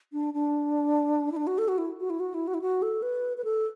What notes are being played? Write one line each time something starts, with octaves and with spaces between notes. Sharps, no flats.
D4
D4
E4
D4
F#4
A4
F#4
E4
F#4
E4
F#4
E4
F#4
E4
F#4
A4
B4
B4
A4